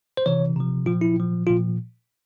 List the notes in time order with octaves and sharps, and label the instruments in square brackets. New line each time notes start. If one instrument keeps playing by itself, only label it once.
[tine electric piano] C5
C3 E3 C#5
C3 F3
A#2 F3 F4
E4
A#2 F3
A#2 F3 F4